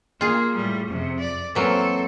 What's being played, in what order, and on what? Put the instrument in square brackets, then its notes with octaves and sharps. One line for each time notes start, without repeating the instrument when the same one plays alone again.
[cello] A#3 [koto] F4 G#4
[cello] A2 G3
F2 C3
D5
[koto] E3 F#3 A#3 [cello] C4 A4